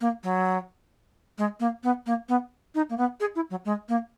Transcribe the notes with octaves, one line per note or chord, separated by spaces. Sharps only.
A#3
F#3
G#3
A#3
B3
A#3
B3
D#4
A#3
B3
G#4
E4
F#3
G#3
A#3